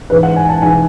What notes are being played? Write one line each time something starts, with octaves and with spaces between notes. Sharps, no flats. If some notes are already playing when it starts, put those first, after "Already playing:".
G#2 E3 G#3 B4
F#5
G#5
A5
G#2 E3 G#3 G#5